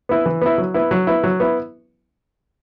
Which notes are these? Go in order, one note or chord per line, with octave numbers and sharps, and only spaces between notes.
B3 E4
E3
B3 E4
F#3
B3 E4
F#3
B3 E4
F#3
B3 E4